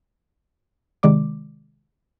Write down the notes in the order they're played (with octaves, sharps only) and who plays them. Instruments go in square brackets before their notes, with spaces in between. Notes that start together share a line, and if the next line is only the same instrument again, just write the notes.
[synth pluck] C3 D#3 G#3 D5 D6